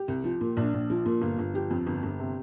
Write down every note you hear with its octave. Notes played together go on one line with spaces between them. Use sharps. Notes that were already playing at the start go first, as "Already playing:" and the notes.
Already playing: G4
C2
F3
A#2
A#1 D4
A#1
F3
A#2
G1 F4
G1
F3 G4
F2
G1
G1
C3